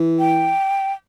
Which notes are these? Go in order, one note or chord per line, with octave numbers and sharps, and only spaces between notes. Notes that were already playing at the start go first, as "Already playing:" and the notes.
Already playing: E3
G5